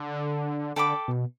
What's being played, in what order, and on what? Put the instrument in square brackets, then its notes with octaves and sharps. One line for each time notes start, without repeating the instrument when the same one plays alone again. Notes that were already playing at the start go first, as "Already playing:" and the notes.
Already playing: [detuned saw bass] D3
[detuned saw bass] D3 [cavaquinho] A4 G5 B5 D6
[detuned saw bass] B2